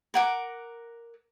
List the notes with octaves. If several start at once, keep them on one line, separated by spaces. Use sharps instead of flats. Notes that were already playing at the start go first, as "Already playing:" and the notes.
A#4 F#5 D6